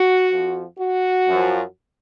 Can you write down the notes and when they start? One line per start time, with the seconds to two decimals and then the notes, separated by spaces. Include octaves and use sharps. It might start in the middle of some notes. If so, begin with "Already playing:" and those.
Already playing: F#4
0.31 F2 F3
0.79 F#4
1.27 F#2 F3